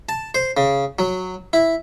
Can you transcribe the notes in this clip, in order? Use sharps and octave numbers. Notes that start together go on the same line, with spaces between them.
A5
C5
C#3
F#3
E4